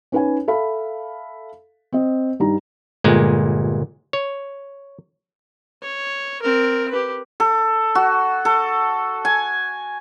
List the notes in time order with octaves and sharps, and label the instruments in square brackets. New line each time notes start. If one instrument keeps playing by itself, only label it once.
[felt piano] C#4 D#4 B4 C#5 G#5
A4 E5 F5 B5
C4 D#5
G2 G3 D#4 A#5
[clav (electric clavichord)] G1 A#2 G#3
C#5
[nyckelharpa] C#5
C4 A#4
G4 B4
[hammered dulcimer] A4
F#4
A4
G#5